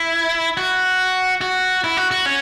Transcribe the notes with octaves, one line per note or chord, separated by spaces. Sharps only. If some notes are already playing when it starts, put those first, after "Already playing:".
Already playing: E4
F#4
F#4
E4
F#4
F#4
C#4